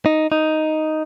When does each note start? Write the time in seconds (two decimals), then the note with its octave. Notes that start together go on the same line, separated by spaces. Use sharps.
0.06 D#4
0.32 D#4